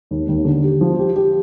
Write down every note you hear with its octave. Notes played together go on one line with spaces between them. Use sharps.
D#2
D#2
D3
G4
F3
G4
G4